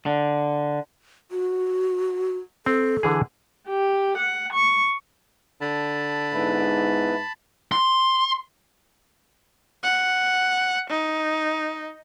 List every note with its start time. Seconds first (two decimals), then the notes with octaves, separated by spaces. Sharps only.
0.06 D3
1.31 F#4
2.66 C4 A4
3.03 D3 E3 G#4
3.68 G4
4.17 F#5
4.52 C#6
5.61 D3 A5 B5
6.34 G#2 B3 E4 B4
7.72 C6
9.83 F#5
10.90 D#4